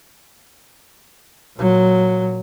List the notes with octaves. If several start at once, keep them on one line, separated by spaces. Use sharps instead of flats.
A#2 F#3